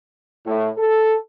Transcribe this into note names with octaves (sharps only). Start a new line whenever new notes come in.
A2
A4